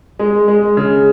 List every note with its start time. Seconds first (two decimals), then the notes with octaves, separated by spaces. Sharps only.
0.19 G#3
0.48 G#3
0.77 C#3